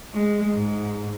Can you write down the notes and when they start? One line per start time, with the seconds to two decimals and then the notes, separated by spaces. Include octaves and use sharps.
0.13 G#3
0.54 G#2